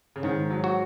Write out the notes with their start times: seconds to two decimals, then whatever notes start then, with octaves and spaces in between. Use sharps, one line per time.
0.16 C#3
0.23 G#2 D#3
0.50 F#3
0.64 F#4